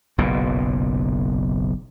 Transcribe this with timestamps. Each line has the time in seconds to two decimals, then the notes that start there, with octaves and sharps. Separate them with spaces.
0.18 F#1 B1 A#2